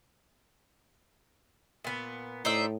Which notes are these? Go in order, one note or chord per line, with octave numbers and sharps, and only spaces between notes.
A#2 B3
A2 D#4 C5 D5 E5